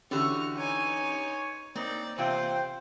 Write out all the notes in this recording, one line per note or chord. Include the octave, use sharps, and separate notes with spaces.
D3 E3 C#4 F#4 G4 C#6 F6
D#4 C#5 G#5
A#3 C4 D#4 D5
E2 C3 F4 C5 G5